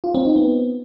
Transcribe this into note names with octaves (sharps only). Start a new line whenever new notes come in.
F4
C4
D#4
B3